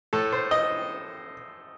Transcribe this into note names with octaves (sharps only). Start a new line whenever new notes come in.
A2 A4
C5
D#5